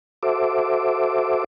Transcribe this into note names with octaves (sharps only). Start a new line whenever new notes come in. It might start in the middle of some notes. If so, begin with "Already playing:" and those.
F#4 A4 C5 E5 D6